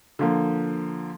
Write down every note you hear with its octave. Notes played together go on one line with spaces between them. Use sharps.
D3 F3 A#3